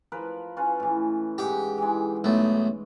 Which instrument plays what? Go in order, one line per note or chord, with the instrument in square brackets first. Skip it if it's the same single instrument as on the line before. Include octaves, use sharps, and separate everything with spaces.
[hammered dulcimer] F3 A#4 B4
C#4 F4 B4
A2 E3
[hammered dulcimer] G#2 F#5 [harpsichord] G4
[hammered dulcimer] E3 G#3
[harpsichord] B1 A3